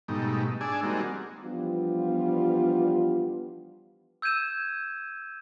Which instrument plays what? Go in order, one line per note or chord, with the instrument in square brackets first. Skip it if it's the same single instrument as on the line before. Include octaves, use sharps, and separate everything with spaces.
[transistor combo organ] G#2 B2 G3 A3 D#4
D4 G#4 D5 G#5 A5 E6
G3 G#3 A#3 C4 D#4 F#4
[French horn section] E3 F3 G3 B3 D4 F4
[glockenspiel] E6 G6 G#6 D#7 E7